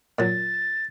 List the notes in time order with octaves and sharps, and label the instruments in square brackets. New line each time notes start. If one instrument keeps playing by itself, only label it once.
[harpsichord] A#2 F#3 [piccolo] A6